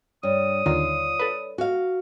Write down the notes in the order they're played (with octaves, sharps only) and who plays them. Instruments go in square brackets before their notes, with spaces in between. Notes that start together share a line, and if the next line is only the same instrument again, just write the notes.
[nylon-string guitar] G2 [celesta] C#5 D5 [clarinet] D#6
[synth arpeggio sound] D#2 D3 D#3 [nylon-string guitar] F4
[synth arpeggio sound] A4 B4
[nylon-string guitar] F#4 F5